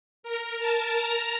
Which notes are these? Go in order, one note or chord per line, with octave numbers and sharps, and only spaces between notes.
A#4
A5
A#5